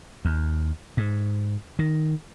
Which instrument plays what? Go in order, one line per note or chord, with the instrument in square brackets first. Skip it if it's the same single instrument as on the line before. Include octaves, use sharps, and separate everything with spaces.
[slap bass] D#2
G#2
D#3